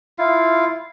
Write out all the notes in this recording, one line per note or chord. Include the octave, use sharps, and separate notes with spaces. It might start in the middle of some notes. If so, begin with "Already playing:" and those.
E4 F4 F5